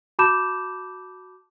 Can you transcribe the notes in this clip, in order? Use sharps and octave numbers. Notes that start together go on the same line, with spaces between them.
F#4 A5 B5 D6 G6 E7